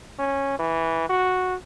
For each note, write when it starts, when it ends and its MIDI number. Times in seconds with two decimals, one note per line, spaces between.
0.19 0.54 61
0.59 1.06 52
1.09 1.55 66